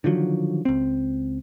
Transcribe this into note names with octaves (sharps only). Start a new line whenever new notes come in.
D3 D#3 F3 F#3
C#2 C4